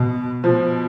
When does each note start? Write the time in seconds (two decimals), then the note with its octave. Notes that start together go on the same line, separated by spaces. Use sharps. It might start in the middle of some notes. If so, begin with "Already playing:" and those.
Already playing: B2
0.44 B2 F3